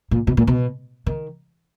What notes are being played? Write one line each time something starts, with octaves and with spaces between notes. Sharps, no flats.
A#2
B2
A#2
B2
D#3